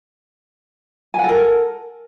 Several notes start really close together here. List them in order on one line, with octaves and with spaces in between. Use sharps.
G#5 F#5 A4 A#4